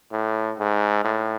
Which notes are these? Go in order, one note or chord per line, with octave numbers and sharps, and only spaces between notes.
A2
G#2
A2